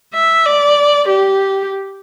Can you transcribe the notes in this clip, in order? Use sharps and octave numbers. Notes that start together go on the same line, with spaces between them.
E5
D5
G4